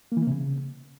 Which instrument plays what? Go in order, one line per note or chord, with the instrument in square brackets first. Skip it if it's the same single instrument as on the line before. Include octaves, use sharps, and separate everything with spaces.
[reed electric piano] A#3
E3
A#3
C3
C#3